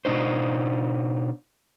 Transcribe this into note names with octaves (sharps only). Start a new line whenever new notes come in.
B2 D4 D#4 C5